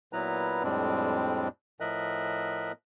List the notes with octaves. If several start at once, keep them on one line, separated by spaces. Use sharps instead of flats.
A#2 F#3 B3 E4 B4 A#5
F2 A2 G3 G#3 C4 D4
A2 F3 A#4 D#5 E5 F#6